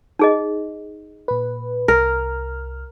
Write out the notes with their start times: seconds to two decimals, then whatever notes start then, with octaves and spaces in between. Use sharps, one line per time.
0.19 D#4 G#4 D#5
1.28 A#2 B4
1.88 C2 A#4 F6